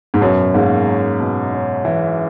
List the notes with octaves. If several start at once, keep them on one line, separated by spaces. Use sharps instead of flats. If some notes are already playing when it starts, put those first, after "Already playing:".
G#2
F#2 B2
G#2 A#3
C#4
B2
C#4
E3